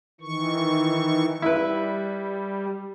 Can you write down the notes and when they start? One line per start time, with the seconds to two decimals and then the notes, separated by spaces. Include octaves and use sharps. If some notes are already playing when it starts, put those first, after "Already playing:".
0.21 D#3 E3 C#6
1.42 G3 E4 B4